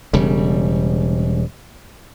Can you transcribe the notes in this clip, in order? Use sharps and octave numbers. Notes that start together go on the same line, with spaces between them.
E1 C#3 G3